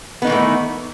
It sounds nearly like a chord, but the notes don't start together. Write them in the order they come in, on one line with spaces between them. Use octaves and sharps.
B3 D#4 D#3 E3 A3